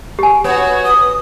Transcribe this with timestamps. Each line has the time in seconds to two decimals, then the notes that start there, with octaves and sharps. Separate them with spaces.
0.19 G4 G#5
0.44 B3 F#4 C#5
0.85 D#6